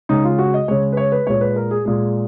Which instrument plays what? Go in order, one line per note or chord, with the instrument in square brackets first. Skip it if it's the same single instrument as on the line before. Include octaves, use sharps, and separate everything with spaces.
[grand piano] C#3 G#3 D#4
F4
F#4
D#5
C#3 G#3 C#5
B4
C#5
B4
A#2 G#3 C#5
B4
A#4
G#4
A#2 G#3 G#4